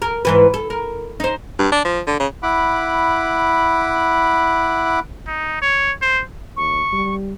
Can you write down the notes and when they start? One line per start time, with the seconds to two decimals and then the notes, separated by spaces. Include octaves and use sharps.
0.02 A#4
0.25 G#2 E3 B4
0.54 A4
0.70 A#4
1.20 D#4 C5
1.59 G2
1.72 D4
1.85 F3
2.07 D3
2.20 C#3
2.43 E4 F#5 B5 D6
5.27 D#4
5.62 C#5
6.02 C5
6.57 D#2 C#6
6.92 G3